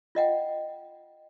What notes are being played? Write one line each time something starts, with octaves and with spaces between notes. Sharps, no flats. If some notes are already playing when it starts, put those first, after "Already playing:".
F4 D#5 F#5 G5